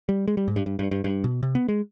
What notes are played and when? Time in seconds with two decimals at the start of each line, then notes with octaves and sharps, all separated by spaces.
0.09 G3
0.28 G#3
0.37 G3
0.48 G#2
0.56 G2
0.66 G2
0.79 G2
0.91 G2
1.04 G2
1.24 B2
1.43 C3
1.55 B3
1.68 G#3